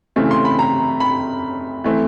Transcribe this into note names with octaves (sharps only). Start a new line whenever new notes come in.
C#3 E3 A3 C4
C6
B5
A#5
B5
E3 A3 C4